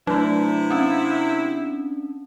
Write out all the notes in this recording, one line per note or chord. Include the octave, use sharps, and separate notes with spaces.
C3 F#3 A3 D4 E4
C4 C#4